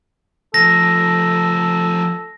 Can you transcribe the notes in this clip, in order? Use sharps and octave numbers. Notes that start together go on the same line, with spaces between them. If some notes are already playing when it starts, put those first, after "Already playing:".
F3 A3 A4 A#6